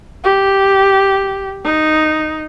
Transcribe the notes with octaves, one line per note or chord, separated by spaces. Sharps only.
G4
D#4